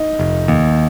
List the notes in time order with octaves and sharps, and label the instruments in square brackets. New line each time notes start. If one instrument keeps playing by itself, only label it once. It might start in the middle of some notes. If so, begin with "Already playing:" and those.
Already playing: [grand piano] D#4
[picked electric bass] F1
D#2